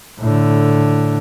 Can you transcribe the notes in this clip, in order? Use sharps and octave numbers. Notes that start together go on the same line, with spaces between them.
A2 D3